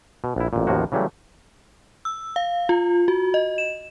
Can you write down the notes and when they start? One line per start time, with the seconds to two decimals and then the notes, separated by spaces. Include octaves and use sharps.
0.24 B2
0.36 A#1 E4
0.53 A1 A#2
0.67 A1 D#2 A2 F3 A#3 F#4
0.92 C#3 E3 F#3 G3 A3
2.05 E6
2.36 F5
2.69 F4
3.08 F#4
3.34 D#5
3.58 E7